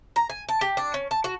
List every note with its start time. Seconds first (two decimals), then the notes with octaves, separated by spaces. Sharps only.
0.16 A#5
0.30 G#5
0.49 A5
0.61 G4
0.77 D4
0.94 C#4
1.11 A5
1.24 F#4